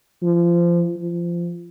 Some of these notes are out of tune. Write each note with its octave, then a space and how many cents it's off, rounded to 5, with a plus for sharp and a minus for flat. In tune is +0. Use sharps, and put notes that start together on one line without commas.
F3 -25
F3 -20